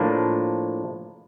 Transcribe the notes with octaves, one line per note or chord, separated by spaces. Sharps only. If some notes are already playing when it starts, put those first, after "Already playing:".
Already playing: A2 F3 A#3 D4